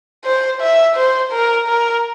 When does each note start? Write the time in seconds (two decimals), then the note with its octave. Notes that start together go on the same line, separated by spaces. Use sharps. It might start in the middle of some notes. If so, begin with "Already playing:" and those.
0.25 C5
0.61 E5
0.96 C5
1.33 A#4
1.68 A#4